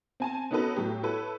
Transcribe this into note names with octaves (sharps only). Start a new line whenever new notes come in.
C4 G#5 A5
B3 C#4 D#4 F#4 A4 B4
A2 F#3 G4
E4 A4 B4 C#5